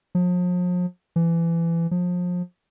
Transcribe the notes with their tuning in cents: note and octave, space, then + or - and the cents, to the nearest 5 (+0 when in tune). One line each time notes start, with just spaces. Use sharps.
F3 +40
E3 +25
F3 +30